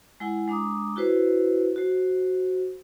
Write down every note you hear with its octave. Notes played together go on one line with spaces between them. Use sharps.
G#3 E4 F#5 G#5
G#3 D4 A#5 D6 D#6
E4 F#4 B4 C5
F#4 C5